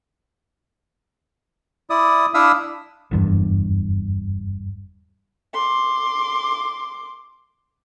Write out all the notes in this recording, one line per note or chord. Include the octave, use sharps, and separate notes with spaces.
E4 D5 D#6
D4 E4 E5 F5 D#6 E6
F#1 E2 G2
C6 D6